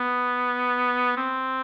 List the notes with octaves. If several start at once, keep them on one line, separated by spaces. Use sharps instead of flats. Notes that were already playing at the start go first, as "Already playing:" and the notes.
Already playing: B3
C4